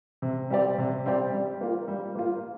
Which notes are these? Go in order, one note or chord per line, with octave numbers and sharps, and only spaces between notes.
C3
G3 C4 G4 D5
C3
G3 C4 G4 D5
G3
A#3 F4
G3
A#3 F4